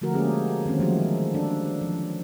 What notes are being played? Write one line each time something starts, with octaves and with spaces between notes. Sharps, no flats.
D3 F3 A3 F#4 A#4
G#3 A#3 C#4 G4 G#4
D#3 A#3 C4 C#4
F3 F#3 G#3 A3 C#4 F#4
D4 A4
F3